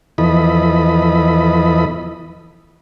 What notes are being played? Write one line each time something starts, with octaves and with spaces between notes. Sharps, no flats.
E2 E3 F3 A4 D#5 B5